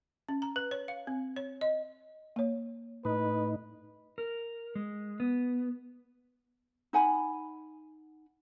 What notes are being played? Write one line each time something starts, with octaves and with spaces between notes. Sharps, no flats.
C#4
A#5
B4
C#5
F5
C4
C#5
D#5
A#3 C#5
A2 D#4 B4
A#4
G#3
B3
D#4 F#5 G#5 B5